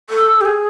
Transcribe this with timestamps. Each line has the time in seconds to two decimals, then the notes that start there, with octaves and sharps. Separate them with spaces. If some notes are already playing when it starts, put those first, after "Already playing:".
0.10 A4
0.41 G4
0.45 G#4